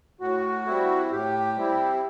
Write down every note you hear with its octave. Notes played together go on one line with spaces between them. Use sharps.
A2 F#4
G3 C4 E4
A2 G4
G3 C4 E4